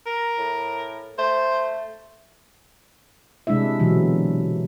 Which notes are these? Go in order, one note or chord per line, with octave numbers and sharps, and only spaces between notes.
A#4
A2
A3 C5
C3 G#3 D4 E4 E5
B2 D3 E3 F#3